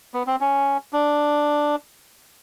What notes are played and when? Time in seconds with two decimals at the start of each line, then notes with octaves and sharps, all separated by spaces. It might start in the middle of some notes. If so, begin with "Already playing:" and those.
0.14 B3
0.27 C4
0.41 C#4
0.93 D4